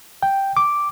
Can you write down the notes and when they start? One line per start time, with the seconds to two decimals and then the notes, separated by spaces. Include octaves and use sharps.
0.23 G5
0.57 D6